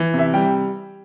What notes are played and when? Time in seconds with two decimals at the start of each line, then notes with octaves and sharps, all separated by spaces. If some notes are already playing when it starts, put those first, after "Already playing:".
Already playing: E3
0.14 C3 E5
0.34 G3 G5